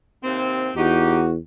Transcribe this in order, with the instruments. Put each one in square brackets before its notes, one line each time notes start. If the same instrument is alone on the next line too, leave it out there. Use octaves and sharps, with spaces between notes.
[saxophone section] D#2 C3 C4
[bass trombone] E2 [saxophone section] D#4 G4 [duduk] F#4